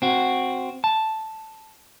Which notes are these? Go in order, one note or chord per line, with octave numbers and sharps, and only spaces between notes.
C4 F#4
A5